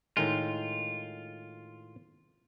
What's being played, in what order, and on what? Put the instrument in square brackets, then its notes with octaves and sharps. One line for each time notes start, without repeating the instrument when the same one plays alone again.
[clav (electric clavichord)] A2 D#3 G#3 [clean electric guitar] F4